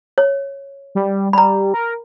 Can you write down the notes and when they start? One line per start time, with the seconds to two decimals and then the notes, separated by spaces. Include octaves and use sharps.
0.18 C#5
0.95 G3
1.33 G3 A#5 B5
1.74 A#4